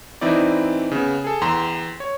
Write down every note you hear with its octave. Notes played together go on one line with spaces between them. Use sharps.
E3 C4 D#4 E4 D5
C#3 B3
G#4 A4
E2 G5 A#5 C6
C#5